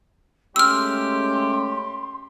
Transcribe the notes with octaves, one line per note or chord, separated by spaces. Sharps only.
G#3 A3 C#4 G4 C6 E6 F6